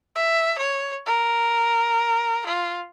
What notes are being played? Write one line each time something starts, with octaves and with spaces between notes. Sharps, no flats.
E5
C#5
A#4
F4